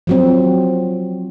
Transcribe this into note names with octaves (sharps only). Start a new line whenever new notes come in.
F3 F#3 C4